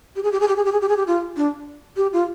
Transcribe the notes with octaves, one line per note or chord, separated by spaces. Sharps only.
G4
G#4
G4
G#4
G4
G#4
G4
G#4
G4
G#4
G4
F4
D4
G4
F4